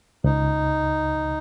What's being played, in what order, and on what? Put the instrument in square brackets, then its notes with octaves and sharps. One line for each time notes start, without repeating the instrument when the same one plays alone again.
[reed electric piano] C#2 [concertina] D#4